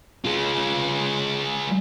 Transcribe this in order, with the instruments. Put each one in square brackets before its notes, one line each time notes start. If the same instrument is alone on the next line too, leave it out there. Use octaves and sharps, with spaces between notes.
[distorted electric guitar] G#3 F4